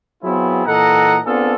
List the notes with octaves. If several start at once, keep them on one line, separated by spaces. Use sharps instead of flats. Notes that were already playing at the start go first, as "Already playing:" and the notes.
F#3 B3 C4 E4 F4 G#4
A#2 E3 A4 D#5 F#5 A#5
B3 C4 D4 F4 G#4 A4